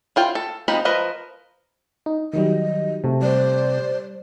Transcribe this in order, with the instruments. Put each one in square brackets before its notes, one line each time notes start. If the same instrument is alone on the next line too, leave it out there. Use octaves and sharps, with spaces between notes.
[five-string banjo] E4 F4 G5
A4
F3 G#3 C4 D#4 B5
F3 A#4 B4 D#5
[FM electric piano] D#4
[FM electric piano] D#3 F#3 G3 [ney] D#5
[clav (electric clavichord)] C3 A3
[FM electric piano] G3 [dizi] C5 [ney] D5